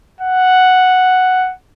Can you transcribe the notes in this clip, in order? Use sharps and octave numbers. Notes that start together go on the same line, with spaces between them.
F#5